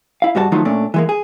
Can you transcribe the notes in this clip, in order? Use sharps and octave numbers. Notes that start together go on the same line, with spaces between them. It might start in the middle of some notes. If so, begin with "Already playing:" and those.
E4 F5
G#2 G3 F#4 C5 A5
D#3 F3 F#3 A3 D#4 F4
A#2 A3 C#4 D4
E3 G#3 A#3
G#4